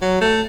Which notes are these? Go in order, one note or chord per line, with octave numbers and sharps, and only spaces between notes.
F#3
A3